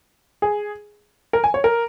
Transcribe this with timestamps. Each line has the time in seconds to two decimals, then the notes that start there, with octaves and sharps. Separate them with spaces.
0.42 G#4
1.33 A#4
1.44 G#5
1.54 C#5
1.64 A#4